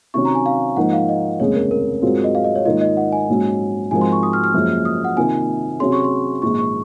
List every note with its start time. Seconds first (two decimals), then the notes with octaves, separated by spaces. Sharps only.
0.14 C3 D#3 F#3 C#4 C#6
0.25 A#5
0.35 G#5
0.46 F5
0.77 G#2 F3 A#3 D#4 F#5
0.93 F5
1.09 D#5
1.40 F1 D#2 C#3 G#3 C#5
1.55 A#4
1.71 A#4
2.02 G#2 F#3 C4 F4 G#4
2.24 D#5
2.35 F5
2.44 D#5
2.55 C#5
2.65 G#2 D#3 A#3 F4 D#5
2.81 D#5
2.97 F#5
3.12 G#5
3.28 A#1 G#2 F#3 C#4
3.91 G#2 F3 C4 F#4 A#4 G#5
4.01 C6
4.12 C#6
4.23 D#6
4.33 F6
4.44 F6
4.54 F#1 F#2 F3 G#3
4.85 D#6
5.04 F#5
5.16 C3 D#3 A#3 F4 G#5
5.80 C3 F#3 C#4 G#4 C6
5.92 C#6
6.04 C6
6.42 A#1 G#2 D#3 G#3 C#6
6.59 C#6